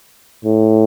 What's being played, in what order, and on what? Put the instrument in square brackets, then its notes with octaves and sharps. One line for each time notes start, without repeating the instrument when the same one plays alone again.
[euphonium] A2